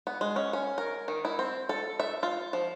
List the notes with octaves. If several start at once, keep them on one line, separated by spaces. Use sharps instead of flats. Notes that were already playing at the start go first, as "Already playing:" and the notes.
B3
G#3
C#4
C#4
A#4
D#3
E4
C4
A4
E5
F4
F3